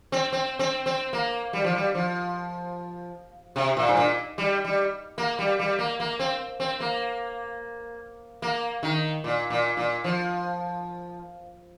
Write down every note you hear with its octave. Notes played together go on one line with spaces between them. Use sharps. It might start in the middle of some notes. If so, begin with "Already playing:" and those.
C4
C4
C4
C4
A#3
G3
F3
G3
F3
C3
A#2
G2
A#2
G3
G3
A#3
G3
G3
A#3
A#3
C4
C4
A#3
A#3
D#3
A#2
A#2
A#2
F3